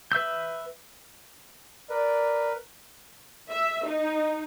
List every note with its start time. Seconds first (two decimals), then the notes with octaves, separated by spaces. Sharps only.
0.12 B4 E5 E6 G6
1.90 A#4 B4 D5
3.50 E5
3.86 D#4